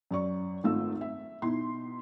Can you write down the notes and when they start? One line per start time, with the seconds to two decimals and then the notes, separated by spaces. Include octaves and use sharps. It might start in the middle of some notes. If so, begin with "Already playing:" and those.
0.11 F#2 D5 C#6
0.64 G#1 A3 F4 E6
1.01 E5
1.42 B2 D#4 E4 C6